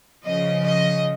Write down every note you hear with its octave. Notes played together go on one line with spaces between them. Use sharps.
C#3 F3 D#5
D#5